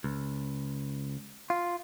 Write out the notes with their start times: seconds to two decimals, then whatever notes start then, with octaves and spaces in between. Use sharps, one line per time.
0.04 C#2
1.50 F4